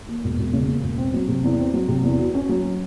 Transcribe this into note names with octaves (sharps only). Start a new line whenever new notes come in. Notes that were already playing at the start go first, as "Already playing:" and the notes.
D#2
E1
E1
C#3
D#2
E1
C4
F#3
C3
E2
C4
F#3
C3
E2
F#4
C#4
F#3